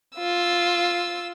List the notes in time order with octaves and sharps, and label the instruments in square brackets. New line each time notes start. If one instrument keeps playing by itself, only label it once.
[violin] F4 E6